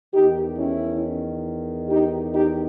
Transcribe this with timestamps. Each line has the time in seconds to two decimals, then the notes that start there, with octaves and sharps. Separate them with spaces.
0.13 E2 D#3 D#4 G4
0.57 C#4 E4
1.89 D#4 G4
2.33 D#4 G4